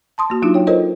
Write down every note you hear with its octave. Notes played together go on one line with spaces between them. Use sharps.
A5 C6 D#6
A#3 F#4
F#3 D4 D#4 F4
C#5 G5
F4 A4 A#4 C5 C#5 D#5